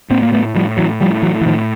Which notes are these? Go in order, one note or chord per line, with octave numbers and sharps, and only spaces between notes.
A2 A#3 C4
A#3
A3 B3
A2 F3 G3
E3 F#3
A2 F3 G3
E3 F#3
E3
A2 D#3 F3